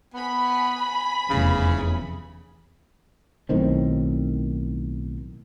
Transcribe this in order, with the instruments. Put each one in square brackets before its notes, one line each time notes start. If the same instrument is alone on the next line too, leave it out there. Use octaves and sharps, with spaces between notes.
[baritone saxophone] B3 [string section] G#5 B5
[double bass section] F1 E2 E3 [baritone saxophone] C#3
[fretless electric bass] B1 A2 D#3 C4